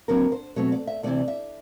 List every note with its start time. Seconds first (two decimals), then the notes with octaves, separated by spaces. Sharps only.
0.08 D#2 D3 F#3 C4 A#4
0.32 C5
0.56 B2 F#3 A3 C4 C#5
0.72 D5
0.87 E5
1.03 D2 C3 E3 D5
1.28 E5